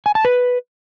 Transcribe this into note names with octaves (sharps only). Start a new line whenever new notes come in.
G#5
A5
B4